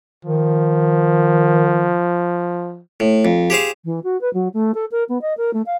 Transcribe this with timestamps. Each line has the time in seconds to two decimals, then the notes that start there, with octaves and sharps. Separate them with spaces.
0.25 D#3 F3
3.00 A2
3.25 F2
3.50 G4 G#4 C5 F5
3.84 E3
4.03 F#4
4.21 B4
4.33 F#3
4.53 A3
4.74 A4
4.91 A#4
5.09 B3
5.21 D#5
5.37 A#4
5.53 A3
5.66 F5